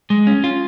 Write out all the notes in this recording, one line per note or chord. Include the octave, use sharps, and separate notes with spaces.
G#3
C#4
F4